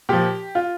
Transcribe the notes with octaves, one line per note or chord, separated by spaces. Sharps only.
A#2 F3 G4
F4